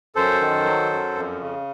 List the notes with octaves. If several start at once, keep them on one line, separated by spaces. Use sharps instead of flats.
F#2 A4 C5
D#3
F#3
F#2
F2
C#3